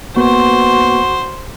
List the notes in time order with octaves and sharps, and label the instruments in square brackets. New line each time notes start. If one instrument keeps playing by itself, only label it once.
[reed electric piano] A#3 B3 B4 [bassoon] F#4 [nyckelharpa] C5